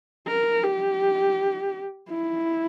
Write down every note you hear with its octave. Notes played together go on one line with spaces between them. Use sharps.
A#4
G4
E4